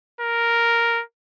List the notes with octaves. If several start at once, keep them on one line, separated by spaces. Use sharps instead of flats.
A#4